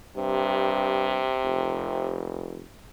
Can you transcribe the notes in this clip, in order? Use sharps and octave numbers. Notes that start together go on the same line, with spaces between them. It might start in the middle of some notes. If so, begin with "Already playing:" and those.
G2 C3
F1